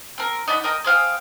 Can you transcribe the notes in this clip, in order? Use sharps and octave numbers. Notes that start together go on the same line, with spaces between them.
C4 A#4
D#4 D5 F#5 B5
A#4 D#5 G5 A#5
G#4 C5 F5 G5